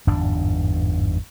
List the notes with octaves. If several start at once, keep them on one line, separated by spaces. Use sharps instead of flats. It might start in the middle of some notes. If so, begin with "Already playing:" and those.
G1 E2 G#2 D4